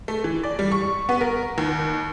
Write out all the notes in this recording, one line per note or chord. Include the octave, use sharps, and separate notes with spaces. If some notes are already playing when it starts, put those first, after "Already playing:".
A3
E3
D5
G3
C#6
B3
A#4
D#2